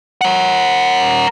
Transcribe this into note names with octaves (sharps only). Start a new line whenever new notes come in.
A#4 F#5